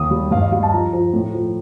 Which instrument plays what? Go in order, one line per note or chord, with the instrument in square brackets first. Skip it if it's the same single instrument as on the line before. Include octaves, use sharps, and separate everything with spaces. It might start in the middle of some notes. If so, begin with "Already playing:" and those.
Already playing: [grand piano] D#2 D#6
G3
G2 F5
D#5
G3 F5
A5
F3 A#5
F3
A2
F3